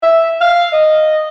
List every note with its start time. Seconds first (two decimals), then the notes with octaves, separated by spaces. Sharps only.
0.03 E5
0.41 F5
0.73 D#5